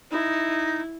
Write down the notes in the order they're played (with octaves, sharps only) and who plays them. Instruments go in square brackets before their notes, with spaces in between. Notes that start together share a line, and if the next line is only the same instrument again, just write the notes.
[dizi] D#4 [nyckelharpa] E4